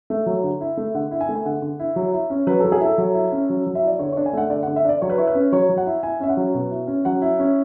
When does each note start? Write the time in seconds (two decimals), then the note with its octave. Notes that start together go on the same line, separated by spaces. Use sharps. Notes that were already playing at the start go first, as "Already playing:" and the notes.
0.10 A3
0.26 F#3
0.43 D3
0.61 E4
0.77 A3
0.95 D3 F#5
1.11 E4
1.21 G#5
1.29 A3
1.35 G#5
1.45 D3 F#5
1.62 D3
1.80 E4
1.96 F#3
2.13 E4
2.30 C#4
2.47 F#3 B4
2.60 A4
2.64 F#3
2.72 G#4
2.81 E4 A4
2.98 F#3
3.14 E4
3.32 C#4
3.50 F#3
3.66 F#3
3.75 E5
3.83 E4 D5
3.99 D3 C#5
4.12 C#5
4.17 D4
4.26 G#5
4.33 A3 F#5
4.50 D3 D5
4.63 F#5
4.67 D3
4.76 E5
4.85 D4 D5
5.02 F#3 C#5
5.10 B4
5.18 E4 C#5
5.27 B4
5.35 C#4
5.52 F#3 C#5
5.69 F#3
5.77 F#5
5.86 E4
6.03 E4 G#5
6.20 C#4 E5
6.29 F#5
6.37 F#3
6.54 B2
6.71 E4
6.87 C#4
7.05 F#3 F#5
7.22 E4
7.39 C#4